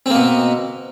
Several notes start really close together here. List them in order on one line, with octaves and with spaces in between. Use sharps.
C4 A#3 B2